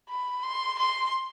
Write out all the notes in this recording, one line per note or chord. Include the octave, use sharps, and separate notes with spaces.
B5
C6
C6